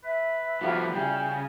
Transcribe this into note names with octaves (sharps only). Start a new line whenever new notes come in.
B4 E5
A2 F3 G3 F4 F#4 A#4
C#3 G3 E4 G5 G#5